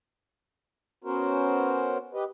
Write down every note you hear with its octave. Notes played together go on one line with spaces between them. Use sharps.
B3 C#4 F#4 A#4 C5
G4 B4 D#5